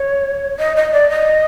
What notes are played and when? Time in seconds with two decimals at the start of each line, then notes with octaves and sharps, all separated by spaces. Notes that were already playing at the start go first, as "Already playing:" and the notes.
Already playing: C#5
0.59 D#5
0.76 D#5
0.93 D5
1.10 D#5